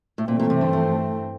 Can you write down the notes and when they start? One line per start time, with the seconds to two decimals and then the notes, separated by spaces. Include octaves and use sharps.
0.18 A2
0.28 G2 A#2 E3 A3 C4
0.39 A#2
0.50 C3
0.61 D3
0.73 F3